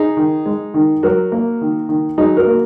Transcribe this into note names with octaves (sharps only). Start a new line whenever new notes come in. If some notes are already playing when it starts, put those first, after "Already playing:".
Already playing: D#4 G#4
D#3
G#3
D#3
F#3 F#4 A#4
A#3
D#3
D#3
F#3 D#4 G#4
F#4 A#4
A#3